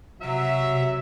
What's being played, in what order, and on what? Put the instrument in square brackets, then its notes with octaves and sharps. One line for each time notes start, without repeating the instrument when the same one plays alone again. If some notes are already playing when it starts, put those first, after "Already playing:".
[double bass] C3 [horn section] F#3 E5